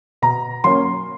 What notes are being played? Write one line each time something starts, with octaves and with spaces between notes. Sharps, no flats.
B2 A#5
F#3 A#3 C#4 C6